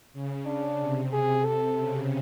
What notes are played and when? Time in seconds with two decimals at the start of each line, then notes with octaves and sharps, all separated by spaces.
0.13 C#3
0.46 D4
0.80 C3
1.13 G#4
1.45 A4
1.79 C#3